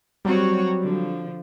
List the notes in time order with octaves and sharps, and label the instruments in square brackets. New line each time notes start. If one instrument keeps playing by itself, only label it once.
[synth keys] F#3 G3 [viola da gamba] C4 F#4 C#5
[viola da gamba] D3 F3